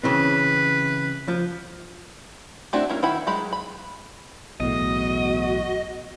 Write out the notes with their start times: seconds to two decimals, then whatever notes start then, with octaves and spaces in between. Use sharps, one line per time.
0.04 C#3 E3 C4 B4
1.28 F3
2.73 A3 C4 D4 E4 F#4
2.90 A#3 C#4 E4
3.02 D#3 E4 F#5 B5
3.27 F#3 G#3 G4 B5
3.53 B5
4.60 B1 E2 A2 F#4 D#5